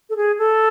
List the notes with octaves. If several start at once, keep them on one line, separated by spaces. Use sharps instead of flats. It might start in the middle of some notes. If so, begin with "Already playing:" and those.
A4
G#4
A4